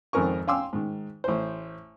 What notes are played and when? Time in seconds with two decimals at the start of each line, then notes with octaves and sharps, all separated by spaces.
0.13 G#1 F2 C4 A#4 G#5 C#6
0.48 F5 G5 G#5 C6 D6 E6
0.73 G#2 D#3
1.24 A1 C5